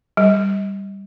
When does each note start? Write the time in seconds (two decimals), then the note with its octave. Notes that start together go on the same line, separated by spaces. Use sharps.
0.17 G3